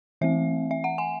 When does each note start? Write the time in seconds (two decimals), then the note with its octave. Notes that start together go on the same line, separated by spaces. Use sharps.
0.21 E3 A3 C4 E5
0.71 E5
0.84 F#5
0.98 G#5